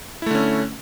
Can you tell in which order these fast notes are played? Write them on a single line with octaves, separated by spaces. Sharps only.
E4 A3 D3 C#4